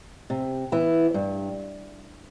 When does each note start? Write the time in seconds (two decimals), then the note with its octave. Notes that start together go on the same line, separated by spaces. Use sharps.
0.30 C3
0.72 E3 B3 E4
1.14 G2